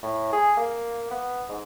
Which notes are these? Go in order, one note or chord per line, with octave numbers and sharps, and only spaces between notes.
A2
G#4
A#3
B3
G#2